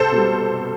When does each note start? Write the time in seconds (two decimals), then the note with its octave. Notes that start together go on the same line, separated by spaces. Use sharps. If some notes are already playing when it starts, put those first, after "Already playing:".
Already playing: C2 A4 C5
0.12 B2 G3